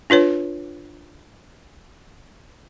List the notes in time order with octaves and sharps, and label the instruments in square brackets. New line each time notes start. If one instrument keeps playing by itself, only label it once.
[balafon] D4 F4 B4 C#5